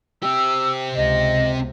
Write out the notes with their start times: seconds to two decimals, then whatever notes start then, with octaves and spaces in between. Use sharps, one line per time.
0.23 C4 G4 E6
0.95 C#2 C3 D#5